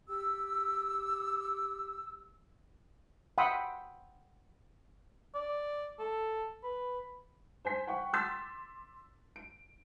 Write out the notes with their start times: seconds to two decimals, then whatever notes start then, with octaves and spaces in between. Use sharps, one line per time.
0.09 G4 E6
3.38 F#5 G5 B5 C6 D#6 E6
5.35 D5
5.99 A4
6.63 B4
7.65 C5 G#5 B6
7.87 F#5 G5 C#6
8.13 C6 D6 E6 A6 B6
9.36 D7